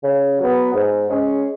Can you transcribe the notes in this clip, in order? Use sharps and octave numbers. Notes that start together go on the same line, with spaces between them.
C#3
F#3 B3
G#2
G#3 C#4 G#4